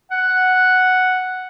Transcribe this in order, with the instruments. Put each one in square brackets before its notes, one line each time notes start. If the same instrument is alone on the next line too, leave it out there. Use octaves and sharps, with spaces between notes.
[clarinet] F#5